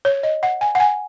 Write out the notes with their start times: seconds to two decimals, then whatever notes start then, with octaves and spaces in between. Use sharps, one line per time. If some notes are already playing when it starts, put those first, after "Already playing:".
0.05 C#5
0.23 D#5
0.43 F#5
0.61 G#5
0.75 F#5
0.80 G#5